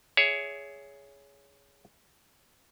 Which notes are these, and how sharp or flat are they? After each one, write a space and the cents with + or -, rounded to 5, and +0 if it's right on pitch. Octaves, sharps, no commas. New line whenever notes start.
G#4 +0 C#5 +20 E5 +0